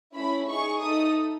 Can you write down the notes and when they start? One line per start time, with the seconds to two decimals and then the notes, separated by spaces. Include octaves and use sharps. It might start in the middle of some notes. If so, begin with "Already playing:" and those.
0.15 A3 C#4 E4 B5
0.49 D#4 G#4 C#6
0.81 A3 D#4 A4 D#6